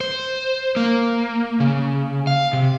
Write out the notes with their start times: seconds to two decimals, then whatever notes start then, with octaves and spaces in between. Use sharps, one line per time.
0.01 C5
0.76 A#3
1.60 C#3
2.27 F5
2.53 C3